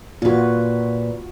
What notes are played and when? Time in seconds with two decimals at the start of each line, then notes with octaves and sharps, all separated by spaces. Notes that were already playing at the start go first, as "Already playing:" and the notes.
0.22 A#2 F4 F#4 B4